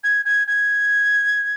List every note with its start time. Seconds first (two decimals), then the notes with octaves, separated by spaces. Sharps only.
0.04 G#6
0.25 G#6
0.47 G#6